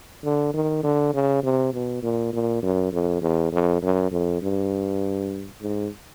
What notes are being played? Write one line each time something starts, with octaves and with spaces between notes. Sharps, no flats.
D3
D#3
D3
C#3
C3
B2
A#2
A#2
F#2
F2
E2
F2
F#2
F2
G2
G#2